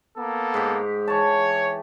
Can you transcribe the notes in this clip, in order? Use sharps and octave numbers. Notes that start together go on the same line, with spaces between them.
A#3 B3 A4
G#2 G4
E3 C#5 A5